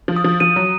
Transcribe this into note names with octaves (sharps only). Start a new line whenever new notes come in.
F3
D#6
F3
F3 D#7
F#3